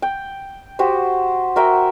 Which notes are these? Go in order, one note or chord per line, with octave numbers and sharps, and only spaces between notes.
G5
F#4 G4 C5
F#4 A#4 E5 G5